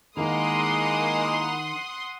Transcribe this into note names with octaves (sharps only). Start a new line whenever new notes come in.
D#3 G#3 A#3 E4 F#5 A#5 C6 D#6